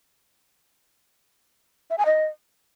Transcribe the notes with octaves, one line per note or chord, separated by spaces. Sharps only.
E5
G#5
D#5